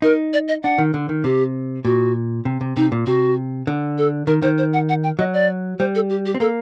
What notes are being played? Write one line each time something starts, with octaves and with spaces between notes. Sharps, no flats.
D#4 A#4
D5
D#5
D4 F#5
D#3
D3
D#3
C3 G4
A#2 F#4
C3
C3
C3 D#4
A#2
C3 F#4
D3
A4
D#3 A#4
D#3 C5
C5
F#5
F#5
G5
F#3 D#5
D5
G3 C5
A4
G4
G4
C4
A#3 A4